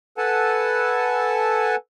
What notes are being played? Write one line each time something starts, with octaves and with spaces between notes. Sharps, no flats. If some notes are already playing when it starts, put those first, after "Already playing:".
A4 B4 F#5 G#5 A5